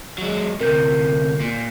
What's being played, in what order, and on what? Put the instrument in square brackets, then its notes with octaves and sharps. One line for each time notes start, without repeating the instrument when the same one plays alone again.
[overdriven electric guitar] F#3 G#3
[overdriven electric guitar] D2 C3 [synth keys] A#4 G6
[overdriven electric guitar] A#2